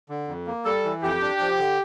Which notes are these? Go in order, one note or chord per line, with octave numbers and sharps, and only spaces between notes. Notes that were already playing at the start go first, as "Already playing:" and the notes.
D3
F2
A#3
G3 A4
E3
F2 G4
D4
F3
D3